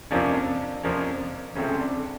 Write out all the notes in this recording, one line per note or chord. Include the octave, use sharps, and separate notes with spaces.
F2 C3 F3 A#3 C#4 D4
F2 C3 F3 A#3 C#4
C#2 C3 F3 A3 C4 C#4
D4